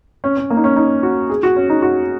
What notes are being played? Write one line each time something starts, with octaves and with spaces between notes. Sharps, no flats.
C#4
C#4
A#3
D#4
C#4
D#4
F#4
G#4
F#4
C#4
D#4
F#4